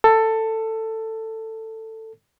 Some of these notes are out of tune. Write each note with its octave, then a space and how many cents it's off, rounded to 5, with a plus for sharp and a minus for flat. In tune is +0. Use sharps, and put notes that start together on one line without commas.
A4 +15